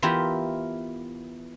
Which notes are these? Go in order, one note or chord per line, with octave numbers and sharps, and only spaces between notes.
E3 B3 E4 F4 G4 A#4